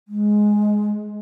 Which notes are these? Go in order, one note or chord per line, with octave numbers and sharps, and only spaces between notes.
G#3